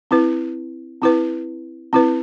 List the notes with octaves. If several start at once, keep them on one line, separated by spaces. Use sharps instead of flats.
C4 E4 B4
C4 E4 B4
C4 E4 B4